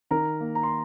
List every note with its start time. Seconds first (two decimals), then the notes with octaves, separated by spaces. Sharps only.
0.11 D#3 A#4 A#5
0.41 A#3
0.55 A#5
0.63 C6